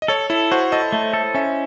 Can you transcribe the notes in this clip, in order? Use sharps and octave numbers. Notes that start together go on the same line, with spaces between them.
D#5
A4 C#5
E4 A4
F#4 C5
A4 D#5
A3
A4
C#4 E5